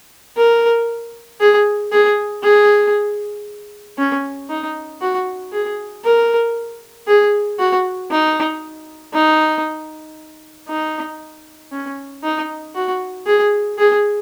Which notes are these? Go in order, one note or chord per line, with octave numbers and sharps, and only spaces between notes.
A#4
G#4
G#4
G#4
C#4
D#4
F#4
G#4
A#4
G#4
F#4
D#4
D#4
D#4
C#4
D#4
F#4
G#4
G#4